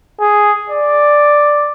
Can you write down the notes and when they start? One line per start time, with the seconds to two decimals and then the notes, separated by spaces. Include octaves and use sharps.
0.20 G#4
0.70 D5